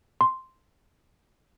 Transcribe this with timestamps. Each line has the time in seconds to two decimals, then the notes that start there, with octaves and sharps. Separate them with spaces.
0.21 C6